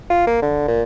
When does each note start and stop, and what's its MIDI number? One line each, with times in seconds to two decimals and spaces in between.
0.10 0.26 65
0.27 0.41 58
0.42 0.65 50
0.68 0.82 46